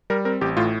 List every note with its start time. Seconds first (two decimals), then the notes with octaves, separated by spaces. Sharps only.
0.10 G3 A#4
0.25 C4 A#4
0.41 A1 G4
0.57 A2 F4